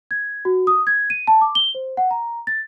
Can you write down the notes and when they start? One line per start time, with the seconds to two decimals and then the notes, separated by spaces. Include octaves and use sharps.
0.11 G#6
0.45 F#4
0.67 D#6
0.87 G#6
1.10 D#7
1.27 A5
1.41 D6
1.55 G7
1.75 C5
1.97 F#5
2.11 A#5
2.47 A6